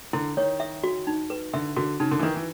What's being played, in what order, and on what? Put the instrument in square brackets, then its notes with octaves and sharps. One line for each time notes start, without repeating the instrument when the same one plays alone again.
[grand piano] D3 [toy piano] E4
[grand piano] D#3 [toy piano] C#5
[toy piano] E5
F#4
D#4
B4
[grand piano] D3 [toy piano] E5
[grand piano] D3 [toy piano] F#4
[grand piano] C#3 [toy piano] D#4
[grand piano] D3
E3
[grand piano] D#3 [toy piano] B4
[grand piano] E3